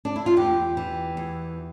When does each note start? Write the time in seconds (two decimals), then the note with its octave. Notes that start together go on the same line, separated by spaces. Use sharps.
0.05 D4
0.16 E4
0.26 F4
0.37 E2 G4
0.77 E3
1.17 E2